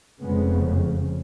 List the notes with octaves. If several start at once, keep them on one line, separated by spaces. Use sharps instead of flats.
F1 F2 C#3 G#3 B3